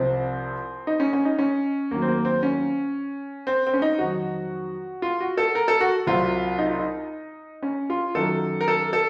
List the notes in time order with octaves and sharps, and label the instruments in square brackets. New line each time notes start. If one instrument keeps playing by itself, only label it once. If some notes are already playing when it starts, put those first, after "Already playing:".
Already playing: [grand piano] C2 C3 F3 C4
D#4
C#4
C#4
D#4
C#4
D#2 D#3 F#3 A#3
C4
A#3
C4
C#4
C4
C4
C#4
D#4
F2 D#3 F#3 F#4
F4
F#4
A4
A#4
A4
F#4
C2 C3 F#3 F4
D#4
F4
D#4
C#4
F4
F#2 D#3 F#3 A4
A#4
A4
A4